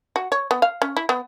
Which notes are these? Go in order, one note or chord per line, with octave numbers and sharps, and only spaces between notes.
F#4
C#5
B3
F5
C#4
E4
B3